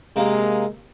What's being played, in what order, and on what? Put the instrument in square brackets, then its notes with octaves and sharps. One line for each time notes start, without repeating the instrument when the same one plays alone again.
[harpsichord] C3 A#3 [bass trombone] G#3